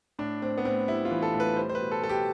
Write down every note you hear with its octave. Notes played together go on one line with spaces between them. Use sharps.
A2 D4
A2 C4
B3
A2 C4
G3 E4
F4
E3
A4
A2
B4
G3 C5
C5
B4
B2
A4
B2 A4
G4